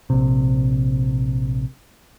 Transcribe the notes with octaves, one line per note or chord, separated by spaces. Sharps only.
A#1 C3